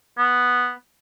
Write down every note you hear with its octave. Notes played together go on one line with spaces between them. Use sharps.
B3